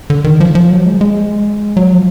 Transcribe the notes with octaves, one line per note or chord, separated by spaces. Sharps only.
D3
D#3
F3
F3
F#3
G#3
G#3
F#3
F3